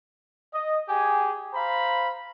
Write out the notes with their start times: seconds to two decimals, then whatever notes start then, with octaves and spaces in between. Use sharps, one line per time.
0.53 D#5
0.89 G4 G#4 G#5
1.54 C5 F5 A#5 B5